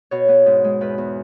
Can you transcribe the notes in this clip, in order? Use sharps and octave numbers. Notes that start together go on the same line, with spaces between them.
B2 C#5
B3
G#2
G#3
E2 B4
E2